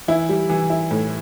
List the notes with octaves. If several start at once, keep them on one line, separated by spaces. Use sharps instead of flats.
E3 E4
G3
E3
E4
A2